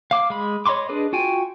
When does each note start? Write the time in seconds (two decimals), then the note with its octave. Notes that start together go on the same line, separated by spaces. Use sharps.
0.11 F5 D6
0.30 G#3 B5
0.66 C#5 D#5 B5 C6 D6
0.89 D4 G#4 B4 D#5
1.13 F4 F#4 G5 G#5